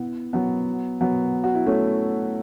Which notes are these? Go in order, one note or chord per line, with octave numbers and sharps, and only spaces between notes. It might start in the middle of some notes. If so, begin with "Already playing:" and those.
Already playing: B3 E4
F#3 B3
F#3 B3
F#4
E4
A3 C#4